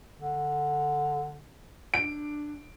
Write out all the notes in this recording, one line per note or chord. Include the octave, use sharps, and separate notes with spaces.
D3
D4 D7